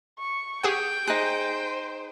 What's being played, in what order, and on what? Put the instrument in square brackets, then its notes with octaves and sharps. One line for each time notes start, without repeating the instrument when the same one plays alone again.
[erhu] C#6
[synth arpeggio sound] G4 G#4 F#5 [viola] G5
[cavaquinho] D#4 G#4 [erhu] C5 [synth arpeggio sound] F#6